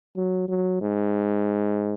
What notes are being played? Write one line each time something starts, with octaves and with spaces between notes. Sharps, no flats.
F#3
F#3
G#2